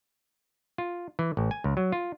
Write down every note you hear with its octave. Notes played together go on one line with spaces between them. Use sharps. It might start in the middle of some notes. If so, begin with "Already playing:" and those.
F4
E3
A1
G#5
C#2
F#3
F4